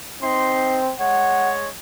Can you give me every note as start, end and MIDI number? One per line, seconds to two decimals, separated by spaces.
0.23 0.93 60
0.23 0.80 63
0.23 0.80 84
0.99 1.68 56
0.99 1.68 73
0.99 1.51 78